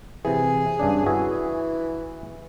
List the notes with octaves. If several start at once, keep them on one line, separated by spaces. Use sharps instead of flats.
C3 E3 G#4
G2 C#3 D4
E3 F#4 G#4 E5